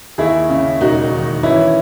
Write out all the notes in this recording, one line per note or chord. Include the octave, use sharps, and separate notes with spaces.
D#2 E4 G#4
C#3
E1 D#4 F#4
D#3
E3 C#4 E4